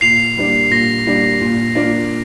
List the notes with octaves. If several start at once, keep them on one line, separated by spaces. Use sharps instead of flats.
A#2 C7 F7
G3 A#3 D4
A#2 A#6
G3 A#3 D4
A#2
A#3 D4 F4